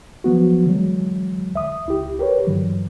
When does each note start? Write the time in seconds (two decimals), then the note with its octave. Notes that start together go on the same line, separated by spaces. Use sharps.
0.24 F3 F#3 B3 F#4
0.66 D3 E3 F#3 G#3
1.54 D2 E5 D#6
1.86 C#2 E4 G4
2.19 G4 A#4 B4 C#5
2.47 G2 D3 E3 F#3